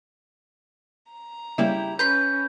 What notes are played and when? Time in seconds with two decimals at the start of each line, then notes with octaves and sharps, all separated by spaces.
1.11 A#5
1.58 C#3 G3 A#3 E4 G4
1.99 C#4 B4 A#5 C6 G6 B6